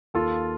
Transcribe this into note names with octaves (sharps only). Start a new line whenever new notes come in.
D#2 F4 A4